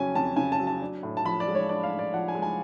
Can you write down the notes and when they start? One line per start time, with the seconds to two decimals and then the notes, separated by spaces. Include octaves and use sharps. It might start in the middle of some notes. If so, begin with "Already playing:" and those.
Already playing: F2 C#3 F#3 C#4 G#5
0.15 F2 A5
0.36 C#3 G#5
0.52 A5
0.60 F#3
0.67 A5
0.82 D4
1.03 A2
1.17 A5
1.25 F3 B5
1.40 D5
1.48 G#3
1.55 C#5
1.69 D4 D5
1.83 F5
1.92 A2
1.99 D5
2.14 F3 F#5
2.28 G#5
2.35 G#3
2.42 G#5